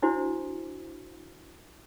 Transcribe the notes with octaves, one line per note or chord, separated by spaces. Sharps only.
D4 E4 F#4 C5